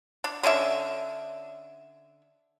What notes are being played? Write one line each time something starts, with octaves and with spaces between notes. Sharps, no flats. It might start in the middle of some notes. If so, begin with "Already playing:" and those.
D4
D3 C#4 D4 E5